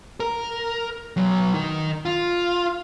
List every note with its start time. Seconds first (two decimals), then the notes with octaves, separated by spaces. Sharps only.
0.20 A#4
1.17 B1 F#3
1.54 D#3
2.05 F4